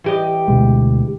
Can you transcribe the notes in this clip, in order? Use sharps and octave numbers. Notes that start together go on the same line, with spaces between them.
E3 G4 D#5
D2 B2 G#3